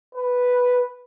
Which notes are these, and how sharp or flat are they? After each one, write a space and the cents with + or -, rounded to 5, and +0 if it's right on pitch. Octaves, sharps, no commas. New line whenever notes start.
B4 +0